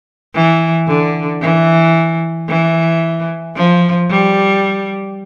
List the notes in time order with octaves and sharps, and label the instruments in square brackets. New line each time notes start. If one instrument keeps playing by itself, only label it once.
[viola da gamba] E3
D3
E3
E3
F3
G3